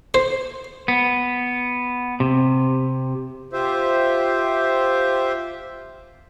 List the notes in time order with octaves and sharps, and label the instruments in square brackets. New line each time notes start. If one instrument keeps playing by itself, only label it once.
[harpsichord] C5
[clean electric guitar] B3
C3
[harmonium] F4 G4 C5 E5